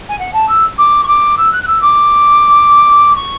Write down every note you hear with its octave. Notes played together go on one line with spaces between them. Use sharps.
G#5
F#5
A5
E6
D6
C#6
D6
E6
F#6
F#6
E6
D6
C#6